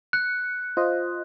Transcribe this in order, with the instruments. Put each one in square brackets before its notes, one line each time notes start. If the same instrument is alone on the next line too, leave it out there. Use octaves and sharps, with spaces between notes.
[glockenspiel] F#6 [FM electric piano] C#7
[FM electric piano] F4 C5 D#5